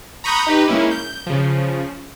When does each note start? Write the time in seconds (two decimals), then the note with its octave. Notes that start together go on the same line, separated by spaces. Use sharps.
0.24 A#5 B5 C#6 D#6 F#6 G6
0.47 D#4 G4 B4
0.68 G#3 A#3 C#4 E4
0.91 G6
1.27 C#3 F3